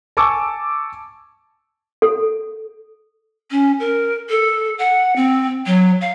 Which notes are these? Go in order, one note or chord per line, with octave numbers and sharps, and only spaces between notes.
G#5 A5 C#6 D6 E6
A4
C#4
A#4
A4
F#5
C4
F#3
F5